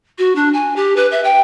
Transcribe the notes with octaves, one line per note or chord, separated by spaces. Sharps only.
F#4
D4
G#5
G4
B4
E5
G5